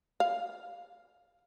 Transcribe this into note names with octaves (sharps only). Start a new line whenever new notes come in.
F5